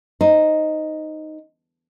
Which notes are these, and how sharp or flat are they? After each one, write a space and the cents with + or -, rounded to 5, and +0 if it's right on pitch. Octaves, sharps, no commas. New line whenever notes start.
D#4 +0 C5 +0